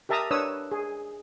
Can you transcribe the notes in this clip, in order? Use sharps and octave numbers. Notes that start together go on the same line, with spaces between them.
G4 A#4 E5 A5 A#5 D#6
D4 A#4 B4 C#5 D#6 E6
G#4